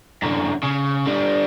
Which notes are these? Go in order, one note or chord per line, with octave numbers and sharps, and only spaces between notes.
F#2 D3
C#3
D3 G3